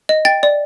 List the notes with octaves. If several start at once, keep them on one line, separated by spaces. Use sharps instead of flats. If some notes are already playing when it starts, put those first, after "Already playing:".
D#5
G5 A6
D5